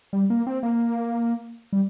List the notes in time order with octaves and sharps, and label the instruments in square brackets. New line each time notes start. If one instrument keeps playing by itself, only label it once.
[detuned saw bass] G3
A#3
C4
A#3
G3